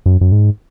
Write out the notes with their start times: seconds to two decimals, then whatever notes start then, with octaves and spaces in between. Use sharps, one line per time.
0.06 F#2
0.21 F#2
0.32 G#2